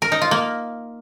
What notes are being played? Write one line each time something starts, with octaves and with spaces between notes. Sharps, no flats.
A#4
D#4
F4
A#3